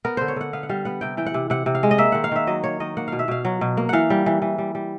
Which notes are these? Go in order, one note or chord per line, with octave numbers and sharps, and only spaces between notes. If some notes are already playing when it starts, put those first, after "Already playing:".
B3 A#4
D3 C5
C#5
D3 F#5
B3 F5
F#5
G3 F5
B3 F#5
C3 G5
E3 G5
F#5
C3
C3 F#5
C3
F5
G#3
D#5
A#3 E5
D#3 F#5
F5
D#3 E5
F#3 D#5
A#3 C#5
D#3 D#5
A#3 F#5
B2 F5
E5
B2 F5
F#3
B2
A#3
E3 F5 F#5
G3
E3
E3
G3
G3